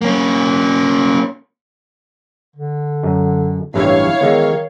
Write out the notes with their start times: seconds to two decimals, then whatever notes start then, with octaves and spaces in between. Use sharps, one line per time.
0.01 A#3 C#4
2.56 D3
3.03 F#2
3.74 A1 G2 E3 E4 C#5 F5
4.21 D#3 E3 G#3 B3